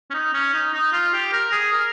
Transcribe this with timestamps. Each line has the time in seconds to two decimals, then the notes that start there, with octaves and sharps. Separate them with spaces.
0.10 C#4
0.14 D#4
0.33 C#4
0.54 D#4
0.73 D#4
0.93 F4
1.13 G4
1.33 A#4
1.52 G#4
1.73 A#4